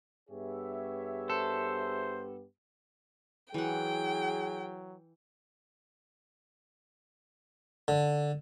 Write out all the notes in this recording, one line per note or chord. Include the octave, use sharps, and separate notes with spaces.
G2 B3 G4 G#4 C#5 E5
A4 C5
E3 F#3 G#4 F#5 G5
D3